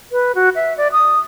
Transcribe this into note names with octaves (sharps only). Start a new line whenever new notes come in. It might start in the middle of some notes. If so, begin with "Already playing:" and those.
B4
F#4
E5
D5
D#6